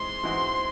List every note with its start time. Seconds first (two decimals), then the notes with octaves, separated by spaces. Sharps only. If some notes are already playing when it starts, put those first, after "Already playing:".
Already playing: G#2 E3 G#3 C4 C6
0.23 G#2 E3 G#3 C4 F#4